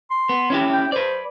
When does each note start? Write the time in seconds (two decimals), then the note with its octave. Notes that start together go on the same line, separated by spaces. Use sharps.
0.11 C6
0.29 B3
0.50 C#4 E4 G4
0.73 G5
0.92 B4 C5 D5